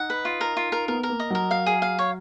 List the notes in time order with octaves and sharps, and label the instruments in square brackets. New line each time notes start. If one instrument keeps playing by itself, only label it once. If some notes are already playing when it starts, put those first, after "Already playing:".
Already playing: [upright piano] D#4 [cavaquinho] F#5
[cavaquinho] B4
F4
A#4
F4
A#4
[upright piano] B3 [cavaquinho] A#4
[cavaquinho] A#4
[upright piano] A#3
[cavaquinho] D#5
[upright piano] F#3 [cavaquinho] A#4
[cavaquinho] F5
G#4
F5
C#5